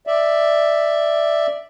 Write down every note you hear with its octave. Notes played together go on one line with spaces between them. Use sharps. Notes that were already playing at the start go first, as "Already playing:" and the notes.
D5 E5